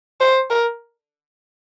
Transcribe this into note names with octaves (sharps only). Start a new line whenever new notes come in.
C5
A#4